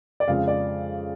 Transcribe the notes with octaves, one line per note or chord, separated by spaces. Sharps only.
D5
F2 C#3 G#3 F5
D5